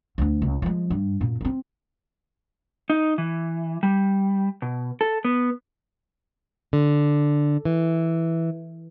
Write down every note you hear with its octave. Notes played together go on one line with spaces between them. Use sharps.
D2 D3
C#2
F3 G#3
G2
F#2 A#2
A#3 C4
D#4
E3
G3
B2
A4
B3
D3
E3